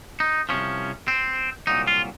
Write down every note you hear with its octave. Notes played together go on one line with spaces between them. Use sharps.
D#4
C2 C3 F3 C#4
C4
C2 A#2 F#3 D#4
F4